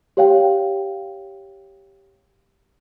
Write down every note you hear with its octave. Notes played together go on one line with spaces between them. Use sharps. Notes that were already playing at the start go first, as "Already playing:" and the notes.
G4 C#5 F5 G5